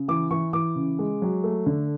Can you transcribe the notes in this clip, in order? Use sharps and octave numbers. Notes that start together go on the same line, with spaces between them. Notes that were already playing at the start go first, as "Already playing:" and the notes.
Already playing: C#3
E3 D6
E3 C#6
E3 D6
C#3
G#3
F#3
A3
D3